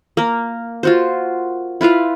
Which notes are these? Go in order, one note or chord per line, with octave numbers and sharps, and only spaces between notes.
A#3 A#4
F4 F#4 C5
E4 F4 B4 F5